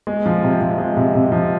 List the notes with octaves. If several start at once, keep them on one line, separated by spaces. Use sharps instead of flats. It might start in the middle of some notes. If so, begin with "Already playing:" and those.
G#3
F3
C3
F3
G#3
C3
C3
F3